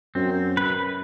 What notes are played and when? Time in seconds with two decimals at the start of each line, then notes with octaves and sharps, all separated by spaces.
0.15 F#2 C4
0.57 B4